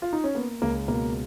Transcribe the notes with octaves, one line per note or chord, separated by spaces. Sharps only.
F4
D#4
C#4
A#3 B3
C#2 A#3
B2 A#3